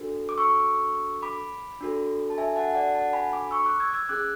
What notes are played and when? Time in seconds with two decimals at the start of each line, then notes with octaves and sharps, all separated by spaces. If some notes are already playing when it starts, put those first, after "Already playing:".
Already playing: D4 F#4 A4
0.29 D6
0.38 C#6 E6
1.23 B5 D6
1.81 D4 F#4 A4
2.30 A5
2.38 E5 G#5
2.56 F#5 A5
2.75 D5 F#5
2.94 F#5 A5
3.13 G#5 B5
3.32 B5 D6
3.51 C#6 E6
3.66 D6 F#6
3.80 E6 G#6
3.94 E6 G#6
4.09 C#4 G#4 D6 F#6